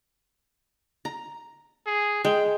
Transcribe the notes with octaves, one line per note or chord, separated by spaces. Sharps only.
A#5
G#4
G#3 G5